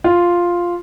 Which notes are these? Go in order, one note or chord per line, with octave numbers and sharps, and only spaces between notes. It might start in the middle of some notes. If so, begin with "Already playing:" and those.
F4